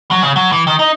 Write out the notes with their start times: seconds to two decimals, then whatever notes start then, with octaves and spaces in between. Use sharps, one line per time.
0.11 F#3
0.23 C#3
0.36 F#3
0.52 E3
0.67 D#3
0.79 D#4